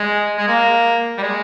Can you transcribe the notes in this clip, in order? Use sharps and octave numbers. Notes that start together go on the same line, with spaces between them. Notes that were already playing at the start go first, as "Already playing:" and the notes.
Already playing: G#3
G#3
A#3
G3
G#3